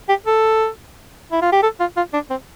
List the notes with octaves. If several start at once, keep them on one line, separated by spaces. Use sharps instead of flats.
G4
A4
E4
F4
G4
A4
F4
F4
D4
C4